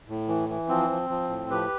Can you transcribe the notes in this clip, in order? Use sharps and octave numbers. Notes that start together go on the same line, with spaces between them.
A2
E3
E3
F3 C4
F3
F3
A2
F3 G4 B4